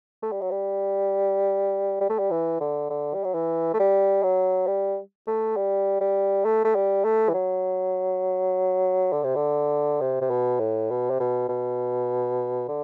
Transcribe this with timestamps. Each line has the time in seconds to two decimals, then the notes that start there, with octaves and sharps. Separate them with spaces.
0.23 A3
0.32 G3
0.41 F#3
0.51 G3
2.01 G3
2.10 A3
2.19 G3
2.31 E3
2.60 D3
2.90 D3
3.14 G3
3.24 F#3
3.34 E3
3.74 A3
3.79 G3
4.23 F#3
4.67 G3
5.27 A3
5.57 G3
6.00 G3
6.45 A3
6.64 A3
6.75 G3
7.04 A3
7.29 E3
7.34 F#3
9.13 D3
9.24 C3
9.36 D3
10.01 C3
10.21 C3
10.30 B2
10.60 A2
10.91 B2
11.10 C3
11.20 B2
11.49 B2
12.68 D3